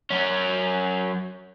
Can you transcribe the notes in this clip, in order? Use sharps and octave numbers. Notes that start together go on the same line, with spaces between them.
F#3 C#4